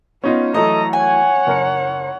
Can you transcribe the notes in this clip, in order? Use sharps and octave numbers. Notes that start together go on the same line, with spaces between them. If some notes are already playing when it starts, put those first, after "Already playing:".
B3 C#4 D#4 F4
E3 F#3 A3 A4 D#5 A#5
C#5 F#5 G#5
F#1 A#4 C#7